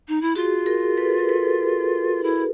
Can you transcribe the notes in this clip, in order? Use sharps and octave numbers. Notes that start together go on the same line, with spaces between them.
D#4
E4
F4 F#4 G#4
G#4 A#4
A4 B4
A#4
A4 B4
E4